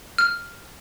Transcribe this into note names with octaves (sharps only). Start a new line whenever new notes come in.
F6